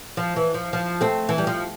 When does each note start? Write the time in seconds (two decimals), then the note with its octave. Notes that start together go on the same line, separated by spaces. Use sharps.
0.17 F3
0.36 E3
0.54 F3
0.73 F3
1.01 A3 C4
1.29 E3
1.38 G3
1.47 F3